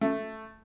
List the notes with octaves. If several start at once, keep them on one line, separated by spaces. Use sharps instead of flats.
A3